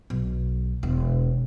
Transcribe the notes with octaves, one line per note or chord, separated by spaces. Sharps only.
B1
E1